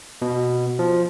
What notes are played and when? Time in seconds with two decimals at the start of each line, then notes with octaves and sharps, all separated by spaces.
0.22 B2
0.79 F3